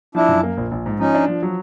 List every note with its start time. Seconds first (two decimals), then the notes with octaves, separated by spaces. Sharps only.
0.15 F3 D4 E4
0.29 F#2
0.43 A#3
0.57 A#1
0.71 A#1
0.86 G#2
0.99 F3 C#4 D#4
1.15 D4
1.28 F3
1.42 F#3